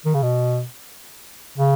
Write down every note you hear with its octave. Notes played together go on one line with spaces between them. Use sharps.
D#3
C#3
B2
C#3